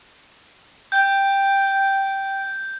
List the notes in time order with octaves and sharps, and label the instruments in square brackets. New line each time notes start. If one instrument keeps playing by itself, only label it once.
[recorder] G5 [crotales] G6